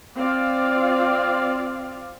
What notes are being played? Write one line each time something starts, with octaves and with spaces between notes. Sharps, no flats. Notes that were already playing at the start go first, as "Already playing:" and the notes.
C4 F4 D5 F5